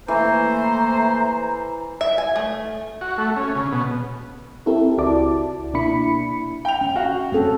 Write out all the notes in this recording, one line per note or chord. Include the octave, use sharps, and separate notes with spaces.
E3 A3 A#3 C5 A#5
E5
G#5
A3
F#4
A3
C#4
C#3
B2
C4 E4 G4 A4 A#4
C#2 E4 F#4 D5 A5 D6
B2 A#3 D4 E4 B5 C#7
G5 F7
C#4
F#4 F5 G5
C4 C#4 A4